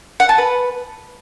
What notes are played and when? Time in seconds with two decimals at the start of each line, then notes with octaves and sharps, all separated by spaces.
0.20 F#5
0.29 A5
0.38 B4